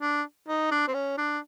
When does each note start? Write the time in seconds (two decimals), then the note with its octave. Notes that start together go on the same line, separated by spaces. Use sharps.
0.01 D4
0.48 D#4
0.71 D4
0.88 C4
0.94 C#4
1.18 D4